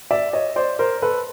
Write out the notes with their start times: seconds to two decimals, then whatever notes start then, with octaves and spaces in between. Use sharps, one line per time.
0.11 D5 E5
0.33 C#5 D#5
0.56 C5 D5
0.79 A#4 C5
1.02 A4 B4